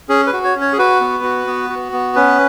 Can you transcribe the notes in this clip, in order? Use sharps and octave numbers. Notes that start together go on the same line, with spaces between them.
C#4 G#4
B4
F#4
C#5
C#4
C#5
G#4
F#4 B4
B3
F#4
B3
F#4
B3
C#4 B4